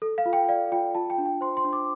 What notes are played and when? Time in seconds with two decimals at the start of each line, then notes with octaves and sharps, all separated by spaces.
0.02 A4
0.18 F5
0.26 F4
0.33 G5
0.49 D5 F5
0.72 F4 G5
0.95 F4 A5
1.10 G5
1.18 D4
1.26 G5
1.41 C5 C6
1.57 C6
1.64 D4
1.73 D6